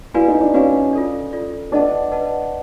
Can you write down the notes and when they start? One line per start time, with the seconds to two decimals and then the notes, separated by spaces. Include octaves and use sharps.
0.14 E4 F#4 B4 D5 F5 G#5
0.28 D#4
0.41 D4
0.54 C#4 F#4 B4 D5 F5 G#5
0.93 F4 A4 D5
1.33 F4 A4 D5
1.72 D4 B4 D#5 F#5 A5
2.12 B4 D#5 F#5 A5